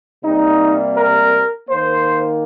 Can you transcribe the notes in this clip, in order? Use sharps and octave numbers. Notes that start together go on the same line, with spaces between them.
C3 G3 A#3 D#4
A#4
D#3 A#3 C5